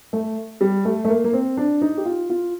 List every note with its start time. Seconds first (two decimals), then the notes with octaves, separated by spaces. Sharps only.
0.13 A3
0.61 G3
0.85 A3
1.05 A3
1.09 A#3
1.24 A#3
1.33 C4
1.57 D4
1.82 D#4
1.97 G4
2.05 F4
2.30 F4